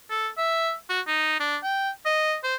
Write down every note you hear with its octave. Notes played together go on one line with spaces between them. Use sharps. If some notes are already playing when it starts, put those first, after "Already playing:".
A4
E5
F#4
D#4
D4
G5
D#5
C5